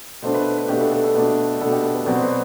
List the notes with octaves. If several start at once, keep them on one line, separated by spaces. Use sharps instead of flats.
B2 A3 D4 C5
B4
B4
B2 A3 D4 G4
A4
A4
A4
B2 A3 D4
B2 A3 D4 A4
G4
A4
B4
B2 F#3 C4 D5
C5
B4